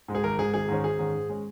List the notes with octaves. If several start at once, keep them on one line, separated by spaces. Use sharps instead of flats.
G#2 G#3
G#4
G#1 A#4
G#2 G#3 G#4
G#1 G#4
G#2 D#3 C#4
G#1 G#4
G#2 D#3 C#4
G#2
G#3 C#4